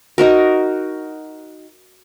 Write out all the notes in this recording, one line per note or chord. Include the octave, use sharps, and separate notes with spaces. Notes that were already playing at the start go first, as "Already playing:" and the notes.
D#4 F#4 A#4